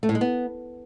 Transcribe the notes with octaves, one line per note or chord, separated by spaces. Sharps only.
A3
A2
G#3
B3